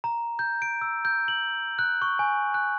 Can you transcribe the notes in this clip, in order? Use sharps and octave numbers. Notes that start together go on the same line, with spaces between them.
A#5
G6
D7
E6
G6
F#7
F#6
C#6
G#5
F#6